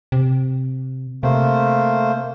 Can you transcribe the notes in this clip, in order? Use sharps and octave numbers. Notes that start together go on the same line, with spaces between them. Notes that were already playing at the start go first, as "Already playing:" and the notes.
C3
C3 A3 A#3 C5